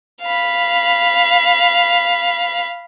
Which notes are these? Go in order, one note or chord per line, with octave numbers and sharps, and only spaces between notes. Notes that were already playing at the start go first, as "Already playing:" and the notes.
F5 B5